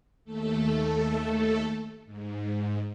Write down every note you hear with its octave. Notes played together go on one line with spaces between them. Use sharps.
D#2 A3 A4
G#2